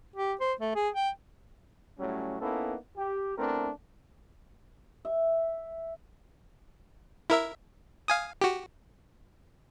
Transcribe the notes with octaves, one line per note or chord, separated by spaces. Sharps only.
G4
C5
A3
G#4
G5
A2 F#3 G3 A3 C#4
A#3 B3 C#4 D#4 E4 A4
G4
A3 B3 C4 D4 E4 A#4
E5
E4 A#4 E5
F5 G#5 D#6
F#4 G4